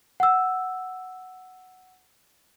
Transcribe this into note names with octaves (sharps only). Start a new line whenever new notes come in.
F#5 E6